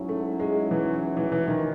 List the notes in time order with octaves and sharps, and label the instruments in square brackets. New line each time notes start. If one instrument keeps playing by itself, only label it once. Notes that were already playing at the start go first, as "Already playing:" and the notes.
Already playing: [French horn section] G#2 F#3 C#4 E4
[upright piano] A3
G#3
E3
E3
E3
D#3